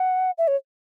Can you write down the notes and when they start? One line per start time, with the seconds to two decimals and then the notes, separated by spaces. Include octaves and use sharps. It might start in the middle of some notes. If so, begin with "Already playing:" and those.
Already playing: F#5
0.38 E5
0.48 C#5